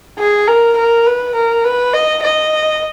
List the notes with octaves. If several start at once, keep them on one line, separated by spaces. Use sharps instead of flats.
G#4
A#4
A#4
B4
A#4
B4
D#5
D#5